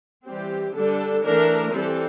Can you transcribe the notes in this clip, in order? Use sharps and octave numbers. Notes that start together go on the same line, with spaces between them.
E3 G3 C4 G4
D3 G3 D4 A4
E3 A3 D4 A#4
E3 G3 C4 A4